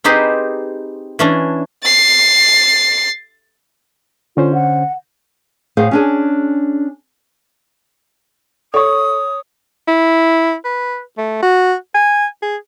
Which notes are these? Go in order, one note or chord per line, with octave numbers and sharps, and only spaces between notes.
C4 D#4 G4 G#4 B4 C5
E3 C#4 D4
A6 C7
D3 C#4 F4 C5
F#5
A2 G#4 C5 F5 F#5
C#4 D4 G#4
A4 C#5 C#6 D#6
E4
B4
A3
F#4
G#5
G#4